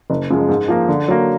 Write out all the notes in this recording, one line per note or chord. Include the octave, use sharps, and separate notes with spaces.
F#1
F#2 F3 G#3
G#2
F3 A#3
D3
F#3 A#3